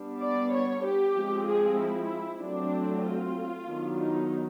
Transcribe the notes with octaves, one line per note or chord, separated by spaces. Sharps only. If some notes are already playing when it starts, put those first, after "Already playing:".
Already playing: G3 B3 D4
D5
C#5
G4
F3 G#3 C4
G#4
E4
F#3 A3 C4 D4
F4
D#3 F#3 B3 D4
D#4